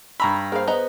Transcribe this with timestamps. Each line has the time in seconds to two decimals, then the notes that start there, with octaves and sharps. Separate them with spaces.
0.20 G2 A#5 B5 C#6 E6
0.52 A#3 G#4 C5 F5
0.67 B3 B4 C5 D#5 A#5